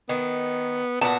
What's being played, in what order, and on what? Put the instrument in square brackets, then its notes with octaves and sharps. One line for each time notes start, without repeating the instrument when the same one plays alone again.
[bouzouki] D#3 [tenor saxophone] B3
[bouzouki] A#2 F#4 [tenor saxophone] B3 [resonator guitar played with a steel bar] A5